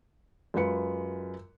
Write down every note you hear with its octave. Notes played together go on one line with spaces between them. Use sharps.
F#2 G#3 F4 B4 C#7